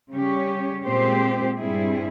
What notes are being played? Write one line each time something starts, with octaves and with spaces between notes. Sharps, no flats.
C#3 G3 C#4 G4 C#5
A#2 G#3 C4 G4 C5
G2 G3 C4 E4 G#4